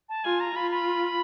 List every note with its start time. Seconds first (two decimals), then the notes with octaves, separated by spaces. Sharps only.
0.09 A5
0.24 F4 G#5
0.40 A#5
0.55 F4 B5
0.71 B5